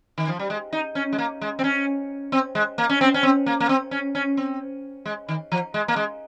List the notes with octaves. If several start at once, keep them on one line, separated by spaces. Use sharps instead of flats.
D#3
F3
G3
G#3
D#4
C#4
G#3
A#3
G#3
C4
C#4
C4
G#3
A#3
C#4
C4
C#4
C4
A#3
A#3
C4
C#4
C#4
C4
G#3
D#3
F3
G#3
A#3
G#3